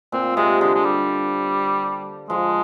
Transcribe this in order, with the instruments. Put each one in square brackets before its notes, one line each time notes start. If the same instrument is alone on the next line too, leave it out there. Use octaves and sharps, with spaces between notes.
[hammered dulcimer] A#2 [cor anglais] C4
[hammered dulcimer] C3 [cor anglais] G#3
[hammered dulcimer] D3 [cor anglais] G#3
[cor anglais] G#3
G3
[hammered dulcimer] F3 [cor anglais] G#3